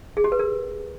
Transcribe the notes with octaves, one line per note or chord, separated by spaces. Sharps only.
G#4
G4
B4
A#4